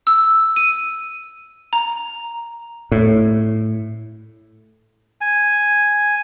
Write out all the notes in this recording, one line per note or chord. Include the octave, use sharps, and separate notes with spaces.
E6
D#7
A#5
A2
G#5